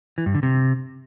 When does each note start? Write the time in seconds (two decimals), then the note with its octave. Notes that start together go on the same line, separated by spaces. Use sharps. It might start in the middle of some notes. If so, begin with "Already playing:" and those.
0.18 E3
0.26 G2
0.34 D3
0.43 C3